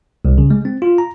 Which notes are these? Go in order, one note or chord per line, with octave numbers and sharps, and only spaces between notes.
C2
C#3
G#3
C4
F4
A#5